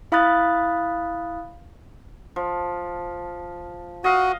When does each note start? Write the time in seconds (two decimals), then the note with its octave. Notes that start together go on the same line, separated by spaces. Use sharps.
0.12 E4 F5 B5 D#6 F#6 A6
2.36 F3
4.04 F#4 D#5 F5